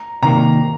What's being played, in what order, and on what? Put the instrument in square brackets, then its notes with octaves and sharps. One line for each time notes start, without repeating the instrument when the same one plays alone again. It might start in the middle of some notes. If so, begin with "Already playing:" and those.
Already playing: [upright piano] A#5
[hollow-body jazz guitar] C3 D#3 A#3 [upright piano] A#5